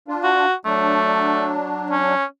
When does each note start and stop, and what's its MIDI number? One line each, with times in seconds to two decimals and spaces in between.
0.08 0.46 62
0.08 0.46 65
0.24 0.54 66
0.65 2.15 54
0.65 1.52 57
0.65 2.15 62
1.91 2.25 61